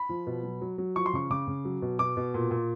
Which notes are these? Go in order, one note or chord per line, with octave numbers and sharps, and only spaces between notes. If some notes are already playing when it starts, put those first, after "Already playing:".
Already playing: B5
F3
B2
F#3
F#3
F#3
F3 C#6
C6
C#3 C#6
C#3 D6
C#3
F#3
B2
B2 D6
B2
A#2
A#2